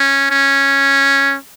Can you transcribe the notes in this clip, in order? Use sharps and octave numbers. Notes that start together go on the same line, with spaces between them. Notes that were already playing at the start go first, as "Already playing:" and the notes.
Already playing: C#4
C#4